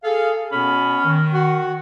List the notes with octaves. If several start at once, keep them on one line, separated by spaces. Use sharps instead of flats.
G#4 A4 F5
B2 B3 C#4 B5
D#3
F#4